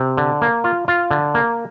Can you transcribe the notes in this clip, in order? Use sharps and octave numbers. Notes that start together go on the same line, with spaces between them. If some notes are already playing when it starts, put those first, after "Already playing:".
Already playing: C3
D3
A#3
F4
F4
D3
A#3